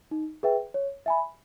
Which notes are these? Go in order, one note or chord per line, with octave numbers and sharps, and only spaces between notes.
D#4
G#4 B4 E5 G5
C#5
E5 G#5 B5